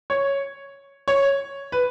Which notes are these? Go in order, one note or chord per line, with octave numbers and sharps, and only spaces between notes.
C#5
C#5
B4